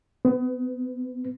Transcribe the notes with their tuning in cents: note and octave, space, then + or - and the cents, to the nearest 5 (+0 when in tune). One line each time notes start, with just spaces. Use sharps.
B3 +30